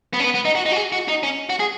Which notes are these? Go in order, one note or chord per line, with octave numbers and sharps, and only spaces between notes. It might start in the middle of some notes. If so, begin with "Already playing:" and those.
B3
C#4
B3
B3
D#4
F#4
D#4
F#4
G#4
F#4
D#4
C#4
F#4
G#4